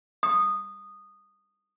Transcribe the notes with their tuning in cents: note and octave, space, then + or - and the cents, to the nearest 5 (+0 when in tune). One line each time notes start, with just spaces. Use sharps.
D#6 -15